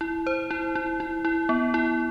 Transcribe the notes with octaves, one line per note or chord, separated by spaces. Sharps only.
E4
C5
E4
E4
E4
E4
B3
E4